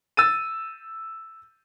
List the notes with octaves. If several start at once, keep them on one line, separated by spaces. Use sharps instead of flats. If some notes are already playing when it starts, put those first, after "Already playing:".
E6 A6 D#7